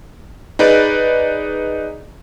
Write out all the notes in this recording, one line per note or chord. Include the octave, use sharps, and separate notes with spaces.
D#4 G#4 B4 D5